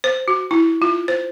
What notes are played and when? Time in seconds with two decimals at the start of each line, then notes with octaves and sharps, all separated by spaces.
0.04 C5
0.28 F#4
0.51 E4
0.82 F4
1.08 C5